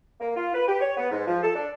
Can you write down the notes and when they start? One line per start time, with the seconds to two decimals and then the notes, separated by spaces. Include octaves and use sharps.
0.21 A#3
0.36 F4
0.54 B4
0.67 G4
0.81 C#5
0.97 B3
1.11 G#2
1.27 F3
1.43 A4
1.55 D4